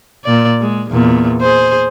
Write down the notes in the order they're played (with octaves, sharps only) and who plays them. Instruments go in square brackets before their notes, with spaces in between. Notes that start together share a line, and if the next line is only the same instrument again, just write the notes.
[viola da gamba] A#2 D5
G#3
E2 A#2
G#4 C5